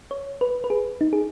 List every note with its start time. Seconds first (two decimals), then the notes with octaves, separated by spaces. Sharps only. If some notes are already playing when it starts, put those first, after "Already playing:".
0.11 C#5
0.41 B4
0.64 B4
0.70 G#4
1.01 D#4
1.13 G#4